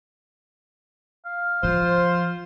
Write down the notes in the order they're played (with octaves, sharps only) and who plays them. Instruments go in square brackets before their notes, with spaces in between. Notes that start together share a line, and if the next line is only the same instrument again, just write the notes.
[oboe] F5
[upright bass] F3 [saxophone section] F4 C5